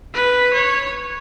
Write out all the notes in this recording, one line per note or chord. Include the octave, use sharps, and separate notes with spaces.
B4
C#5